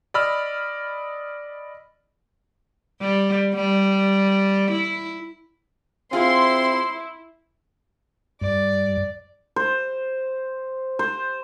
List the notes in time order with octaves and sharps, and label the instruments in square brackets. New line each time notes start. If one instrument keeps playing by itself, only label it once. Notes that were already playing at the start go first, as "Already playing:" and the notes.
[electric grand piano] D5 D#5 B5 E6 F6
[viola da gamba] G3
G3
E4
[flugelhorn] C4 [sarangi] E4 [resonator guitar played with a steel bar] F4 G#4 [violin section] C6
[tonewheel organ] G2 [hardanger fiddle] D5
[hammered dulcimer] C5
C5